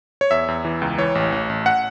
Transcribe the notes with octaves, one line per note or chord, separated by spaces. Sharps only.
C#5
E2 E5
E2
E3
C#2
E3 C#5
A1
A1
A1
F#5